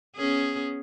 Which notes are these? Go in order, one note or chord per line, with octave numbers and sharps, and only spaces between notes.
B3 C#4 G#4